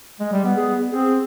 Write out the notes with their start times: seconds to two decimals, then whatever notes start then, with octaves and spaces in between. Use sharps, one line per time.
0.20 G#3
0.32 G3
0.45 B3
0.56 G#4
0.92 C4 G#4